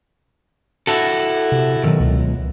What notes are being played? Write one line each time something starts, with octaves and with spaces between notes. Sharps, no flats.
E4 F#4 A4
C3
B1 F2 D#3
C#2